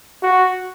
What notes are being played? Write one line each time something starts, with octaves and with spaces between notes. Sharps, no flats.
F#4